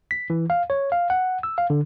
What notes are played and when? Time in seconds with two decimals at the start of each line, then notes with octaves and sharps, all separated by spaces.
0.11 B6
0.30 E3
0.50 F5
0.70 C#5
0.92 F5
1.10 F#5
1.43 E6
1.58 F5
1.70 D3